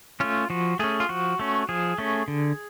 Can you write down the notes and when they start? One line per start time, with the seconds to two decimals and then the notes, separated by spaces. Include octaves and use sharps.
0.20 A3 C#4 F4
0.50 F3 F#4
0.79 A3 C#4 G#4
1.00 F4
1.09 F3 F#4
1.39 A3 C#4
1.69 F3 G#4
1.98 A3 C#4
2.28 D3